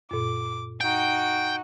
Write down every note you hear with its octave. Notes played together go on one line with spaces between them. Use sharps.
F#2 A#2 D6
D#4 F#4 G5